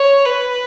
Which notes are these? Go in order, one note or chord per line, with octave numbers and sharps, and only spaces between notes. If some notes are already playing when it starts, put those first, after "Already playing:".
Already playing: C#5
B4